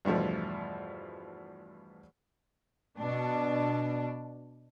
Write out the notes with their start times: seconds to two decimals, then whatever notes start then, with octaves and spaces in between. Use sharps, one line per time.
0.05 E2 G2 B2 F3 A3
2.99 B2 D4